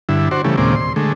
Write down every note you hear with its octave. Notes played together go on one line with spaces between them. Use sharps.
G2 D3 E4
D4 F#4 C5
C#3 E3 G3 A3
D#2 A#2 C#3 G#3 C4 D5
C6
D3 G#3 A3